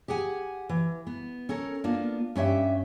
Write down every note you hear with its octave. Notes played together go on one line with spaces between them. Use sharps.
G4 G#4 F#5 G#5
E3
B3
C#4 A4 A#4
A#3 B3 D4 F4
G2 C#4 G4 E5